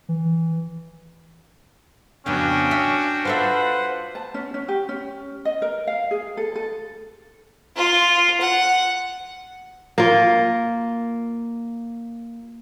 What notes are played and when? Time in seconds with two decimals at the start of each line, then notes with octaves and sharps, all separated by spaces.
0.09 E3
2.26 F2 C#3 B3 C#4 D4 F#4 G5
2.71 E5
3.25 F4 A4 B4 C5 E5 F#5
4.15 A5
4.34 C#4
4.54 C#4
4.68 G4
4.89 C#4
5.45 D#5
5.62 A#4
5.87 F5
6.11 G#4
6.37 A4
6.56 A4
7.76 F4
8.41 F#5
9.98 A#3 F4